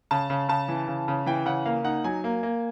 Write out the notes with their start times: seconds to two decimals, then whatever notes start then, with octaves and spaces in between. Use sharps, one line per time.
0.11 C#3 A5
0.30 C#3
0.49 C#3 A5
0.68 E3
0.88 C#3
1.08 C#3
1.26 E3 G5
1.46 C#3 F#5
1.66 A#3 F5
1.84 D#4 F#5
2.04 F#3 G#5
2.24 A#3
2.43 A#3